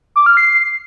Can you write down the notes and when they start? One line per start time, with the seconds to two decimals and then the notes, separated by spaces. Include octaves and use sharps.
0.16 D6
0.26 F6
0.37 C7